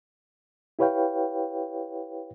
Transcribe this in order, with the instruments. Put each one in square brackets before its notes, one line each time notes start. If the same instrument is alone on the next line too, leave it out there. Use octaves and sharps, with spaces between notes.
[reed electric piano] E4 G4 B4 C#5 F5 G5